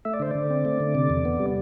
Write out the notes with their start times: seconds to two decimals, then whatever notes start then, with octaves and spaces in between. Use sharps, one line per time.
0.05 A3 E5
0.13 D5
0.20 D3 C5
0.31 D3 D5
0.50 C4
0.65 A3
0.80 D3
0.95 C3
1.10 E2
1.25 B3
1.40 G3